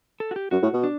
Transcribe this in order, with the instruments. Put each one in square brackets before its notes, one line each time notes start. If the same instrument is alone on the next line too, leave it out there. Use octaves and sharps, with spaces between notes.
[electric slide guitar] A4
F#4
G4
[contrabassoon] F#2 [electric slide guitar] F#4
[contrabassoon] A2
B2
[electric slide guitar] D4